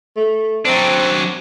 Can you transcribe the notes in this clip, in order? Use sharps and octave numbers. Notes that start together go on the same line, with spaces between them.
A3
F#3 C4 D4